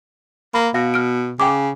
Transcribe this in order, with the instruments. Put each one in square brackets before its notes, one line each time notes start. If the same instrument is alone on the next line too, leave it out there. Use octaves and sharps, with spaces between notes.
[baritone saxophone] A#3 [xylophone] B5
[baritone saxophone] B2 [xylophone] F5 A#6
[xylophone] F6 D7
[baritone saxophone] C#3 [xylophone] G5 D6